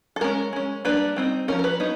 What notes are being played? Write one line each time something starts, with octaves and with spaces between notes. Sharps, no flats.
A4
G#3 C#4 A#4
G#3 C#4
G3 A#3 D4 B4
G3 C4 D#4
F3 A3 C#4 A#4
A#4
B4
F#3 B3 D#4